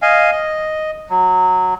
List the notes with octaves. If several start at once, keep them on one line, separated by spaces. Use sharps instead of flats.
D#5 F5 G#5
D#5
F#3